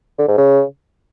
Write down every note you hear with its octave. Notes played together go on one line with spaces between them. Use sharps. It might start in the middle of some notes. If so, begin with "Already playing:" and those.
D3
G#2
C#3